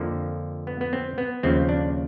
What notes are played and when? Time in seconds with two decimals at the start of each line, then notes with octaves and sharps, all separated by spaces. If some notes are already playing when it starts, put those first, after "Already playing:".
Already playing: F2 D3 F3 A#3
0.67 B3
0.81 B3
0.93 C4
1.18 B3
1.43 D#2 C#3 F3 C4
1.69 D4